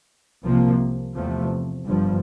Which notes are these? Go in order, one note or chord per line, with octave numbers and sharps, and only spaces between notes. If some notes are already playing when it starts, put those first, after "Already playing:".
C2 C3 F3 A#3
E2 C3 F3 A3
G1 G2 F3